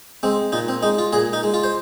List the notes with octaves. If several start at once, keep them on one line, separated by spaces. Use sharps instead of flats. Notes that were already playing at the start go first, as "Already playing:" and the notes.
G#3 C4
A#2 D#4
C4
G#3 D#4
F4
A#2 G#4
D#4
G#3
F4
C5